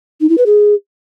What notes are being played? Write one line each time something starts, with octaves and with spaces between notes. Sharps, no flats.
D#4
E4
B4
G#4